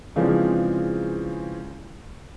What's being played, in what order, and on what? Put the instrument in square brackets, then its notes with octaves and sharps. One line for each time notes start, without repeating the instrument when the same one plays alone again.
[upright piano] C#3 E3 F3 G#3 C4 D4